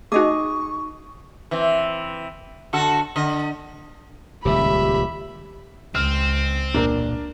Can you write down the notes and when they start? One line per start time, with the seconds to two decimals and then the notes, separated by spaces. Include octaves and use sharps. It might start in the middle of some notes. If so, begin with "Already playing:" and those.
0.12 A3 D#4 F#4 G#4 D#5 C#6 D6
1.51 E3 C4
2.73 D3 F#4 A4
3.16 D3 D#5
4.45 D#1 C#2 G4 E5 B5
5.95 C#2 C4 F6
6.74 E1 A#2 A#3 D4 A#4